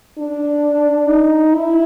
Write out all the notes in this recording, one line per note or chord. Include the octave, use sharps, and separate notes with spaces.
D4
D#4
E4